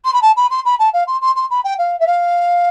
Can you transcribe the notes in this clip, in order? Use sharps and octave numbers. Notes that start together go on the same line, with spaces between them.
C6
B5
A5
B5
C6
B5
A5
F5
C6
C6
C6
B5
G5
F5
E5
F5